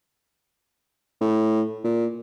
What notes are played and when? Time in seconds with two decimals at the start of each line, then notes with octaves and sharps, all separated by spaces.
1.21 A2
1.84 A#2